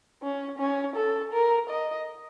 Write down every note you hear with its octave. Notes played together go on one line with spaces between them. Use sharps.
C#4
C#4
A4
A#4
D#5